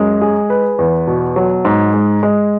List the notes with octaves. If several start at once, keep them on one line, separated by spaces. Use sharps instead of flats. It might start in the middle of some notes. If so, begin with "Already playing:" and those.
Already playing: F#2 G#3
G#4
B4
E2
B2
F#3
G#2
G#3
G#3